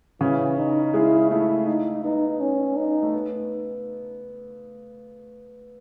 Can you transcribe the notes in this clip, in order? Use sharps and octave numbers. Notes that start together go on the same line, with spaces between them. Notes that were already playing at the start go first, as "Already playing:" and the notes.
C#3 E3 C#4
D#4
G#3 E4 G#4
A3 E4
D#4
B3 D#4
C#4
D#4
A3
B3